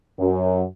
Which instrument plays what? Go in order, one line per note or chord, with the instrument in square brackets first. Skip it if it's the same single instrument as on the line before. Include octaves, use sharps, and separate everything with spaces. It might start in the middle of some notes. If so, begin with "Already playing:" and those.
[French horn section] F#2